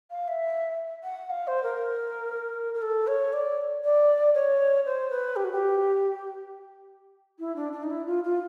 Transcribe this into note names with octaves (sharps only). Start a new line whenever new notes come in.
F5
E5
F#5
F5
C5
A#4
A#4
A4
C#5
D5
D5
C#5
C5
B4
G4
F#4
G4
E4
D4
D4
D#4
E4
F4
F4